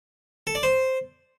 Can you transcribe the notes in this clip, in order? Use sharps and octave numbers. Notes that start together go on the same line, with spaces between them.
A4
D5
C5